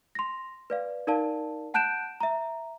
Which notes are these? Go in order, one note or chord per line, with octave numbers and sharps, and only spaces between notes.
C6 A#6
B4 D5 F5
D#4 A#4 D5 F5 A5
F#5 A5 F#6 G6 D7 E7
E5 A#5